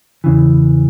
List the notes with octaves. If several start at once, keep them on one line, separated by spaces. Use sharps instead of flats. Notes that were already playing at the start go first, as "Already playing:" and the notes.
E2 C#3 E3